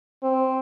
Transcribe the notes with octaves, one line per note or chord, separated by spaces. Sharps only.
C4